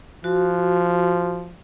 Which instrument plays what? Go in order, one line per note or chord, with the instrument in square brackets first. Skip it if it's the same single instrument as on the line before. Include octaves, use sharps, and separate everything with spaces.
[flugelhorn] F3 [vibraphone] F#4